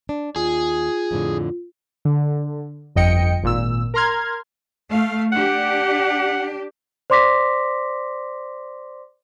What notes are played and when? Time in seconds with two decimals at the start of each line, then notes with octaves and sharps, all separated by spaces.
0.09 D4
0.36 D#2 F4 G#4
1.11 F2 A2 D3
2.05 D3
2.96 G1 F2 D#5 G5 C#7
3.43 G#1 A#2 E6
3.94 A#4 A#5 C6 F6 G#6
4.90 A3 F5
5.32 D4 G4 F#5
7.10 C5 D5 C6 D6 A#6 B6